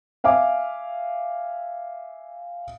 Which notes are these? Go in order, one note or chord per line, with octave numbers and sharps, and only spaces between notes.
E5 F5 G#5 D6